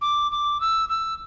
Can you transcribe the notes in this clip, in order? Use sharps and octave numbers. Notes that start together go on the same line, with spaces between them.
D6
D6
E6
E6